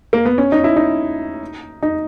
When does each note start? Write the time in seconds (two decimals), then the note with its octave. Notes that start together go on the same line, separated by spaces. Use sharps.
0.13 A#3
0.25 B3
0.38 C#4
0.52 D#4
0.64 E4
0.77 D#4
1.83 D#4